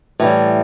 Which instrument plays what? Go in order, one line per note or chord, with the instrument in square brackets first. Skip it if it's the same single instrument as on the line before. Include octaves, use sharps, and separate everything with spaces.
[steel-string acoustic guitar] A2 E3 G3